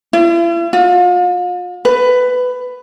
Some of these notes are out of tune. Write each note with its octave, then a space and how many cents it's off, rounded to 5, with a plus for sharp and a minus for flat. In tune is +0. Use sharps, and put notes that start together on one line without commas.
E4 +45
F4 +40
B4 +15